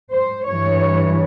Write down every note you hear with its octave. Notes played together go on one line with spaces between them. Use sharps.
C5
G2 E3 C#5